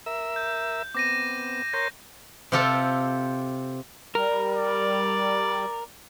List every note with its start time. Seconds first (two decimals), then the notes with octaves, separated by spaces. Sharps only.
0.06 A#4 E5 E6
0.36 G6
0.95 B3 C4 D6 A#6 D#7
1.73 A#4 C#5 C6 G6 A#6
2.52 C3 C4 F4 G4 A4
4.15 G3 A#4
4.55 D5